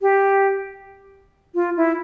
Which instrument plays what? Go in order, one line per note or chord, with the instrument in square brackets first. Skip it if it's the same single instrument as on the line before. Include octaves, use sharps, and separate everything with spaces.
[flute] G4
F4
E4